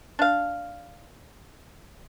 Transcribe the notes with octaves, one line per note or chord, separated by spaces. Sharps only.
D4 F5